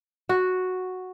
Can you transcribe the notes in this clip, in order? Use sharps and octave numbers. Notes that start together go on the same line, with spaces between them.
F#4